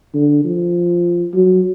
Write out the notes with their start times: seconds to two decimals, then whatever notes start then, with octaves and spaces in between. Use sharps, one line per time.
0.14 D3
0.45 F3
1.34 F#3